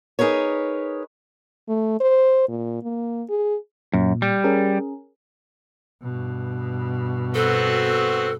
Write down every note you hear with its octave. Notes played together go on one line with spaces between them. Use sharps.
D#4 G#4 A#4 B4 C#5
A3
C5
A#2
A#3
G#4
F#2 A#2
G3
C#4 G#4 A#4
G2 B2
B3 C4 F#4 A4